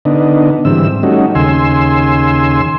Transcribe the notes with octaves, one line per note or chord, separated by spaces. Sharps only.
D3 B3 D4 D#4
G#2 D3 E3 G3 C4 E6
G3 A3 C#4 D#4 F#4
D#2 C#3 G#5 C6 E6